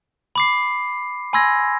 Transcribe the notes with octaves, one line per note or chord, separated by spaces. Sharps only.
B5 D6 C7
G#5 B5 C6 E6 G#6 A#6